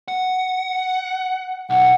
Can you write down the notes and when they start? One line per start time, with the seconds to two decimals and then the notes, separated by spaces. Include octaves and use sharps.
0.08 F#5
1.70 B1 F#5